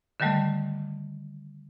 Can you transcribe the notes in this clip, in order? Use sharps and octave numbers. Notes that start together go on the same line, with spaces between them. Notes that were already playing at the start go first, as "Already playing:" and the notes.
D3 D#3 F#3 G3 A3